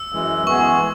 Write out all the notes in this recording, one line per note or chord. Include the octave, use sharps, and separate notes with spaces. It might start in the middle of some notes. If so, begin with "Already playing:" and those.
Already playing: E6
F#2 E3 G#3
E3 G#3 B3 G#4 C#6